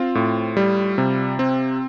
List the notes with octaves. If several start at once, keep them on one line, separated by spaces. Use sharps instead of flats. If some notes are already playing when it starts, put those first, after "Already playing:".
Already playing: C4 F4 F5
A2
G3
C3
C4